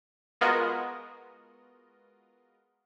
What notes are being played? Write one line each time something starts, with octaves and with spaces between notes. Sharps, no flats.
G#3 B3 F4 F#4 A#4 D#5